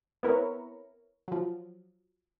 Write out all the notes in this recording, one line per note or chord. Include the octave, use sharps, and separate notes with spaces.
B3 C4 E4 A#4 B4 C#5
F3 F#3